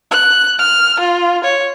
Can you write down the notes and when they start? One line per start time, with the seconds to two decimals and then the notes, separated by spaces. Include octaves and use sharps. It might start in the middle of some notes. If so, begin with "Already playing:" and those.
0.11 F#6
0.59 F6
1.00 F4
1.44 C#5